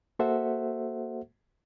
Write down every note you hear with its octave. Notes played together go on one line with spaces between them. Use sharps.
A#3 F#4 A4 C5 E5 F#5